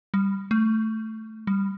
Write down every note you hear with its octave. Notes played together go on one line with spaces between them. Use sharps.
G3
A3
G3